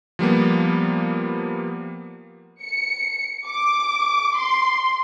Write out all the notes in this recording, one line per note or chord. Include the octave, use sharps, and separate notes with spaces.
F3 G3 A#3 B3
C#7
D6
C6